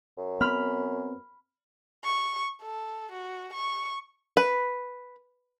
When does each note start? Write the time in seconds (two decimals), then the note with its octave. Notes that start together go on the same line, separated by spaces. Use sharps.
0.18 F#2
0.41 B3 C4 B5 F6
2.04 C#6
2.62 A4
3.12 F#4
3.53 C#6
4.37 B4